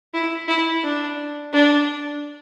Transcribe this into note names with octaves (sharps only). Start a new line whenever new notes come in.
E4
E4
D4
D4